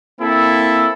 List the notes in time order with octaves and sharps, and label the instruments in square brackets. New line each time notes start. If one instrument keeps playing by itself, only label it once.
[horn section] A#3 C4 E4 A4